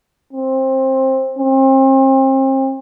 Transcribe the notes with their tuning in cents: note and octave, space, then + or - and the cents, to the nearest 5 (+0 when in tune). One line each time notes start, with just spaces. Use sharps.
C4 +20
C4 +35